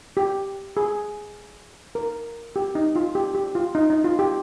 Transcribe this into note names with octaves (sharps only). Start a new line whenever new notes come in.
G4
G#4
A#4
G4
D#4
F4
G4
G4
F4
D#4
D#4
F4
G4